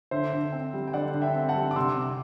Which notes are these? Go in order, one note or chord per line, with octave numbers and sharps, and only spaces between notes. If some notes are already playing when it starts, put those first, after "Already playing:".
D3 C5 E5
D3
C4
G3
G5
D3 D5 F#5
D3
E5 G5
C4
F#5 A5
G3
D6
C3 C6 E6
C3